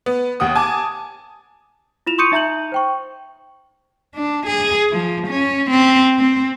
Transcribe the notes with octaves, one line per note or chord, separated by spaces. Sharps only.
B3
D#2 F#5 D#6
G#5 A5 D6
E4 F4 E7 F7
C6 C#6 D#6 G6 C#7 D#7
D#4 E5 A#5 G6 F#7
C5 G5 C#6
D4
G#4
F3
C#4
C4
C4